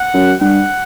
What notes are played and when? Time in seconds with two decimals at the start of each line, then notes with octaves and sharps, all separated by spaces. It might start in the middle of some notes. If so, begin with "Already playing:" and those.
Already playing: F#5
0.14 F#2
0.41 G2 F#5